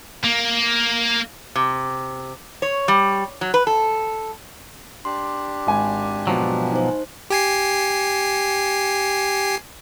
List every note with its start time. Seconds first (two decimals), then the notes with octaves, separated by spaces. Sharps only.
0.24 A#3
1.56 C3
2.62 C#5
2.88 G3
3.41 F#3
3.54 B4
3.67 A4
5.05 D4 G4 C6
5.67 G#1 G#5
6.27 B2 F3 F#3
6.72 D#4 C5
7.30 G4 G#5 C7